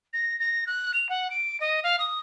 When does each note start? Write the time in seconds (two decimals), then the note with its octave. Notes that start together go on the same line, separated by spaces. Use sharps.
0.13 A#6
0.39 A#6
0.66 F#6
0.93 F7
1.09 F#5
1.30 D7
1.60 D#5
1.83 F5
1.99 D#6